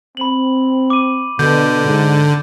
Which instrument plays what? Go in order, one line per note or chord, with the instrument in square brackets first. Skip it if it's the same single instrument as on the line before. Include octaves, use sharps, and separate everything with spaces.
[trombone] C4 [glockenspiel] B5 F#7
[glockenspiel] D6 D#7
[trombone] B2 [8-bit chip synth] D3 [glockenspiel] G6
[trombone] G#2